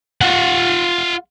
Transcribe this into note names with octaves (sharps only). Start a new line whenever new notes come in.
F4 F#5